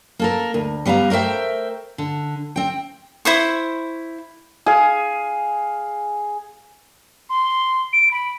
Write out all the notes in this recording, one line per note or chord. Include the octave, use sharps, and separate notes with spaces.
A#3 A4 A#4
D2
G3 B3 F5 A5 A#5
A3 A#4 C5 E5 G5
D3
C4 G5
E4 C5 C#6
G#4 F5
C6
D7
B5